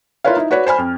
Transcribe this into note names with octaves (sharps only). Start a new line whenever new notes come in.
E4 F4 A#4 B4 C#5 F5
D#4 E4
F#4 B4 C#5 D5
C5 G#5 B5 F6
F2